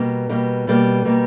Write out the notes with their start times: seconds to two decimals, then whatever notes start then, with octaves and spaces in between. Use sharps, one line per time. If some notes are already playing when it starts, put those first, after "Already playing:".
Already playing: B2 G3 A#3
0.29 B2 G3 A#3
0.67 B2 G3 A#3
1.05 B2 G3 A#3